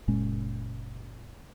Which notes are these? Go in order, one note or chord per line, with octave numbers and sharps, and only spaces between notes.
F#1 A#2 G#3 C#4